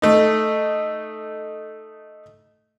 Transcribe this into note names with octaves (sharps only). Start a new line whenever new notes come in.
A3 D#4